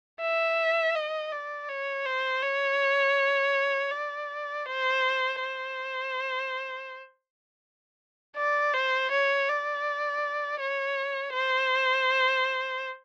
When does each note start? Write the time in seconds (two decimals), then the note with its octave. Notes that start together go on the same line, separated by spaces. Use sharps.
0.21 E5
0.95 D#5
1.32 D5
1.69 C#5
2.05 C5
2.42 C#5
3.91 D5
4.66 C5
5.40 C5
8.37 D5
8.74 C5
9.11 C#5
9.49 D5
10.60 C#5
11.33 C5